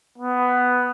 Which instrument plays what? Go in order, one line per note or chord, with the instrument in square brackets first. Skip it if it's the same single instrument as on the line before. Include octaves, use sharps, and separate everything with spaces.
[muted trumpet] B3